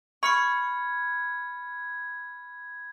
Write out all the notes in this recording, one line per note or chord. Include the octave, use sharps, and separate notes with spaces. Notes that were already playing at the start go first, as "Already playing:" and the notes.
B5 C#6 F6 G#6 C#7